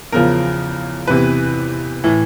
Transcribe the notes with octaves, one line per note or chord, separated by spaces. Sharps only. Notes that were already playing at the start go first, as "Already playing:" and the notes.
E2 C#3 F3 A#4
E2 C3 E3 B4
A2 E3